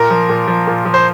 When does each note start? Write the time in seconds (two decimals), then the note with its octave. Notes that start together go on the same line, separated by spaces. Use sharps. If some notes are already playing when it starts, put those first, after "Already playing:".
Already playing: A#2 A#4
0.10 F3
0.29 A#2
0.48 F3
0.67 A#2
0.85 F3
0.94 C5